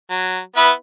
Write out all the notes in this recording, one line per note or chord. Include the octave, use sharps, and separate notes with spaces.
F#3
B3 E4 B4